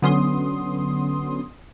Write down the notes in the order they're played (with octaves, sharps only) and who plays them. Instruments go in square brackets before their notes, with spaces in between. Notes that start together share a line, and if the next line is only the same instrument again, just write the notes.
[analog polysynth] D3 F#3 B3 C#4 C6 D#6